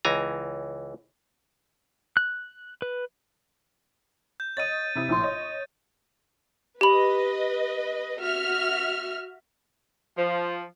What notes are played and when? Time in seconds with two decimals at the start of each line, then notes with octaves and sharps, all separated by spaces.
0.05 C#2 E3 G#5 A#5
2.17 F#6
2.82 B4
4.40 G6
4.57 C#5 D#5 D#6 A6 D#7
4.95 C3 E4 D#6
5.09 A#1 A2 C6
5.23 C#5 D#5
6.81 G4 B4 D#5 B5
8.22 F#4 E5 F6
10.17 F3